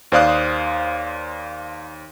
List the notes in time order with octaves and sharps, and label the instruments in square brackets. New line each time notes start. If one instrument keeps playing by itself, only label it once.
[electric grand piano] D#2 C5 D5 F5 D#6 F#6